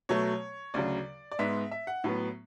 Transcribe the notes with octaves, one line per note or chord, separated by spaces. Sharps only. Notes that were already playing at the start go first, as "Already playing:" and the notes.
B2 F#3 A3 C#5
D2 C#3 F#3 D5
D5
G#2 G#3 B3 E5
E5
F#5
A2 F#3 B3